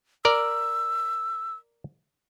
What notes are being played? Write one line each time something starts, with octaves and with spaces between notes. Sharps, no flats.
A#4 D5 E6